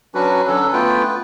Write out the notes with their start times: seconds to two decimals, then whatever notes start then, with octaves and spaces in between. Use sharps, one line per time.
0.15 F#3 C#4 D4 F#4 B4
0.48 D3 F#3 C#4 D4 A4
0.73 A3 B3 F4 B4 G5